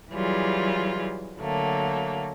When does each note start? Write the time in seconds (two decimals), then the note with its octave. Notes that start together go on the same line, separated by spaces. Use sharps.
0.12 E3 F#3 G3 F4 G#4
1.38 D3 F#3 A3 A#3